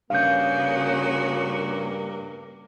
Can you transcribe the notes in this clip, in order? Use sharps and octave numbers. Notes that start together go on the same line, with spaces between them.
G2 C#3 A#3 F#4 F5 G6